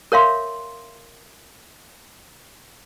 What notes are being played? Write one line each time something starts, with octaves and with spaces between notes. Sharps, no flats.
A#4 C#5 E5 F5 C6